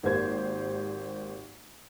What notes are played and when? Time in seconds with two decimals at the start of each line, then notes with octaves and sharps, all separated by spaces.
0.03 G#1 A#3 G4 C5 G#6